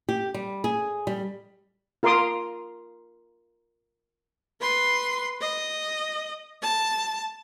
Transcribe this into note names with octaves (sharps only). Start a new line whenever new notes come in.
G4
G3
G#4
G3
F4 A#4 F5 C6 D6 D#6
B4 C6
D#5
A5